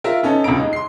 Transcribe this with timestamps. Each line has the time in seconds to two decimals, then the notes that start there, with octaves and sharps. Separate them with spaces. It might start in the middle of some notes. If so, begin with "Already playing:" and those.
0.04 F4 A#4 E5
0.23 B3 C#4 D#4 A4
0.44 D#1 C#2 C#3 A#5 D7
0.59 G#3 D#4
0.73 C6 C7